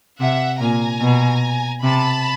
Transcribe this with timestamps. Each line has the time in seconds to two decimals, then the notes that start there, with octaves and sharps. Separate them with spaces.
0.19 C3 E5 F#5
0.60 A#2 G#5 A#5
1.01 B2
1.82 C3 A5 B5